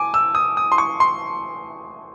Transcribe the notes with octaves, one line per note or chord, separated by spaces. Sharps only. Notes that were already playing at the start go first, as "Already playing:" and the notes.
Already playing: G#5 D6
E6
D#6
D#6
C6
C#6
C6